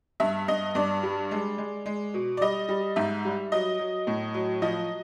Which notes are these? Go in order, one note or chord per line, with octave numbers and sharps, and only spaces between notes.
G2 E5
G2 D#5
G2 D5
G3
G#3
G#3
G#3
B2
D5
G3 D#5
G3
G#2 E5
G3
F#3 D#5
F#3
A2
F#3
F3 D#5